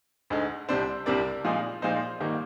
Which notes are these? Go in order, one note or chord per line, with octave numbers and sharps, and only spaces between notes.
D2 D3 G#3 D#4
C2 C3 G3 D4 C5
C2 C3 G3 D4 A#4 D5
A#2 F3 G#3 D#4
A#2 F3 G#3 D#4 C5
G#2 D#3 G3 A#3 D#4